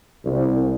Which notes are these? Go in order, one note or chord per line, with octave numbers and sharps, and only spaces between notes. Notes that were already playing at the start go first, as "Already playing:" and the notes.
C2